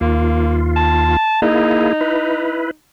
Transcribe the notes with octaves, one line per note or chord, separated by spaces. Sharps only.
D#2 A#3 F4
A5
A#3 D#4 E4 G#4
E4 B4